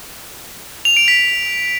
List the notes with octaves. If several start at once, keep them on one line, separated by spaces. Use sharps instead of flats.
F7
D7
B6